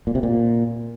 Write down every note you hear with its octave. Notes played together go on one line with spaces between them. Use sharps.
A#2
C3
A#2